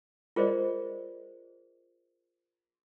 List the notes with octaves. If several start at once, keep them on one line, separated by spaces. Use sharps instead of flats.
F4 G#4 A#4 C5 D5 D#5